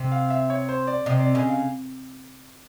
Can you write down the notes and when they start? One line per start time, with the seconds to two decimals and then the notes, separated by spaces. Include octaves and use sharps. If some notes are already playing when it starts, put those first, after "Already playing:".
Already playing: C3
0.12 F5
0.30 E5
0.50 C#5
0.69 C5
0.87 D5
1.06 C3 D#5
1.20 D5
1.34 C#3 D#5
1.49 F5